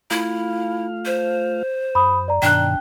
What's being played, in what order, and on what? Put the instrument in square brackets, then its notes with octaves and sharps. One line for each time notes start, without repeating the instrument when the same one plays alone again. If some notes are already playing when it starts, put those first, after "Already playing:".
[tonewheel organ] A3 F4 F5 [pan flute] E4
[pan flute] C5
[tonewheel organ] F#2 [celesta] B5 D#6
[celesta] D5 A#5
[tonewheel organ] G2 B2 D#3 [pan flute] D4 [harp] G5 F#6